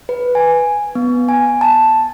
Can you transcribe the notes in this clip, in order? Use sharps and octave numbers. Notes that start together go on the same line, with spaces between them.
B4
G#5
B3
G#5
A5